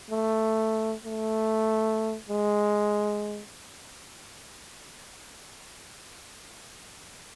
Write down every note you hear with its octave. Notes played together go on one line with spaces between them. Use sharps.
A3
A3
G#3